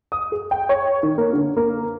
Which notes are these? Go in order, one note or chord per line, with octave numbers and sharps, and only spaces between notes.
D#6
G#4
G5
C#5
D#3
A#3
D3
A#3